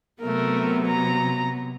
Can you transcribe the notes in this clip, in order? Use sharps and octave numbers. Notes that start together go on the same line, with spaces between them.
C3 F#3 A3 B3 A#4
A#5